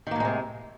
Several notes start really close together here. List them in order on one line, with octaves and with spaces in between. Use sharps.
D#3 A#3 A2 G#3 C3